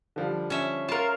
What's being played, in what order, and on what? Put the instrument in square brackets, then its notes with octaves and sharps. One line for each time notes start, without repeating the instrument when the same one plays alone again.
[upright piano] D3 F3 G3
[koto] C#4 E5
[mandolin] F4 A#4 [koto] A5